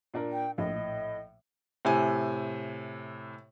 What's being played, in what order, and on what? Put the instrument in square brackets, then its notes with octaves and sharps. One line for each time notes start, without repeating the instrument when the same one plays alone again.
[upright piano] A#2 D4 A#4
[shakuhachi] G5
[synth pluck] A#1 [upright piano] A2 [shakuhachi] D#5
[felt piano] A2 C3 G#5